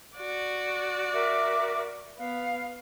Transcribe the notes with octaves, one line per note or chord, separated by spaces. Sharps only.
F#4 D5
A#4 E5 D6
B3 F5